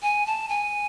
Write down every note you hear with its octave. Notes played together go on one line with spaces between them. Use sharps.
G#5
A5
G#5